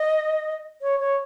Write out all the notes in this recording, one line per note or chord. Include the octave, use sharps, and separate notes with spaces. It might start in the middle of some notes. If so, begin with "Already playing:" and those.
Already playing: D#5
C#5
C#5